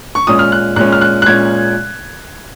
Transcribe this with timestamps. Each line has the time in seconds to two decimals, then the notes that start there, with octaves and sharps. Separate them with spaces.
0.15 C#6
0.27 A#2 G#3 C#4 D#6
0.39 F6
0.52 F#6
0.76 A#2 G#3 C#4 F#6
0.92 F6
1.01 F#6
1.22 F#6
1.26 A#2 G#3 C#4 G#6